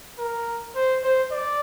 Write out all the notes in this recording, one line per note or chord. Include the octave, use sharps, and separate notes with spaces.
A#4
C5
C5
D5